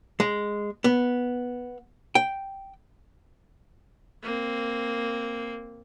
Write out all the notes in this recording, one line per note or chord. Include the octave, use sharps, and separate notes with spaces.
G#3
B3
G5
A#3 C4